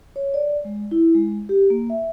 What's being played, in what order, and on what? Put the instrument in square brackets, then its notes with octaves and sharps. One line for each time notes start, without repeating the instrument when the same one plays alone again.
[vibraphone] C#5
D5
G#3
E4
G#3
G4
A#3
E5